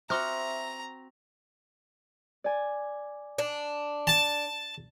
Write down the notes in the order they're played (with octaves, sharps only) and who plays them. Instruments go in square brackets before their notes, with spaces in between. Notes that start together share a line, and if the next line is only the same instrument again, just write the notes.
[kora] C4 F#4 [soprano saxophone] E5 [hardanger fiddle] A#5 [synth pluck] C6 D6 F6
[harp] D5 G#5
[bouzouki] D4
[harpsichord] A5